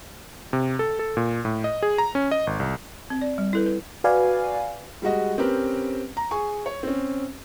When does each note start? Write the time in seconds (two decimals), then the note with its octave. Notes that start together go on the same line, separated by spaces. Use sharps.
0.53 C3
0.79 A4
0.99 A4
1.17 A#2
1.45 A2
1.64 D#5
1.83 G#4
1.98 A#5
2.15 C#4
2.31 D#5
2.47 G#1
2.60 C2
3.10 C4
3.22 D5
3.38 G3
3.53 E4 A4 B4
3.66 B4
4.04 F#4 B4 D5 F5 G#5
5.02 G3 G#3 F#4 D#5
5.38 C4 C#4 G4 A#4 B4
6.17 A#5
6.31 G#4 G#5 C#6
6.66 C#5
6.83 C4 C#4